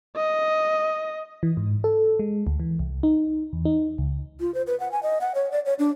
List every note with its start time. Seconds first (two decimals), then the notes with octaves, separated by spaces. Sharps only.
0.16 D#5
1.43 E3
1.57 G#2
1.84 A4
2.19 G#3
2.47 D2
2.60 E3
2.79 C2
3.03 D#4
3.53 E2
3.65 D#4
3.98 C#2
4.40 F4
4.54 C5
4.67 B4
4.80 F#5
4.92 G#5
5.03 D#5
5.21 F#5
5.35 C#5
5.52 D5
5.66 C#5
5.79 D4